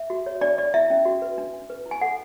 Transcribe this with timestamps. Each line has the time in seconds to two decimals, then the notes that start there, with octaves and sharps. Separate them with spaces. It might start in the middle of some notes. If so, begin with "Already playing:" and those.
Already playing: E5
0.10 F#4
0.26 C#5
0.41 D4 D5
0.58 D4 D5
0.74 E4 E5
0.90 C#4
1.05 F#4
1.22 B4
1.38 D4
1.53 D4
1.70 B4
1.86 E4
1.91 G#5
2.01 A4 F#5